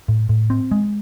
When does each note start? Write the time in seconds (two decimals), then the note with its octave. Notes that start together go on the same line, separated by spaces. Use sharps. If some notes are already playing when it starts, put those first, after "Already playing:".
0.08 A2
0.29 A2
0.50 C4
0.71 G#3